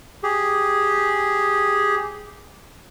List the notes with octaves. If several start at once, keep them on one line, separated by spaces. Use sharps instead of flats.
G4 G#4